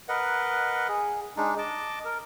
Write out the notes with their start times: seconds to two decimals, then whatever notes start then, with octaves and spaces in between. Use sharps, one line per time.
0.09 A#4 B4 D#5 F#5
0.88 G#4
1.37 G#3 D4 D#4
1.58 D#5 A5 D6
2.04 A#4